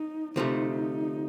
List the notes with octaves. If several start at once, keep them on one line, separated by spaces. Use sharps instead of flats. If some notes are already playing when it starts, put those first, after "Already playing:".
Already playing: D#4
D2 C3 F3 A3 D#4